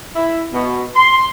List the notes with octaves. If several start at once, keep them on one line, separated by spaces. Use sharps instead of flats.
E4
B2
C6